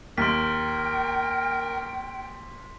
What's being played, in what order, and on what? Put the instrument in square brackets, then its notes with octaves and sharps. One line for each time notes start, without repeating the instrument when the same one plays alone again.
[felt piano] D#2 [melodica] A#4 [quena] G5 [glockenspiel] C6 B6